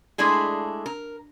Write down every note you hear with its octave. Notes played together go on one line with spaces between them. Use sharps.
G#3 A3 D4 E4 G#4
A#4